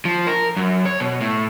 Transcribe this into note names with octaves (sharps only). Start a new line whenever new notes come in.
F3
A#4
F#2
C#5
B2
A2